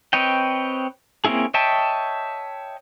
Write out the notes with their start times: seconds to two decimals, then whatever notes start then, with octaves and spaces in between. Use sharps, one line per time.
0.13 C4 B4 C#5 D#5 G5
1.25 A#3 C4 C#4 E4 G#4
1.54 C#5 D#5 E5 G5 A5